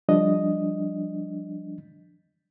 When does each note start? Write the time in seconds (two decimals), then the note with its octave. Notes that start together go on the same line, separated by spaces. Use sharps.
0.09 F3 G3 D4 D#5